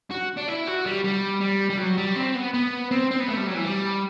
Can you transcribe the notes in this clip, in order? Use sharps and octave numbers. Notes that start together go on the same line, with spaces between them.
F#4
D4
E4
F#4
G3
G3
G3
G3
F#3
G3
C4
B3
B3
C4
C4
B3
A3
G3
F#3
E3
G3